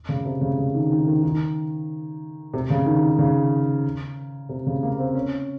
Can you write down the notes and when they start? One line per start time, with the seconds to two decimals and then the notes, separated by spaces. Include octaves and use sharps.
0.09 C#3
0.25 C3
0.41 C#3
0.59 C#3
0.75 D#3
0.91 D#3
1.07 D#3
1.23 D#3
2.54 C3
2.70 C#3
2.86 D#3
3.02 D#3
3.19 C#3
4.49 C3
4.67 C#3
4.83 A#3
4.99 C4
5.15 C#4